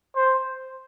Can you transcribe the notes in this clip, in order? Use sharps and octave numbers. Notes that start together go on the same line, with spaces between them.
C5